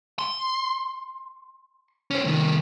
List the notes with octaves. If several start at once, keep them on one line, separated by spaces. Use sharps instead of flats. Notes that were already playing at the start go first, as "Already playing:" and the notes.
C6
C#4 C5
C2 D#3